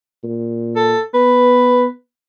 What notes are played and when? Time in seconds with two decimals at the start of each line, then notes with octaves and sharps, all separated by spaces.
0.23 A#2
0.76 A4
1.14 B3 B4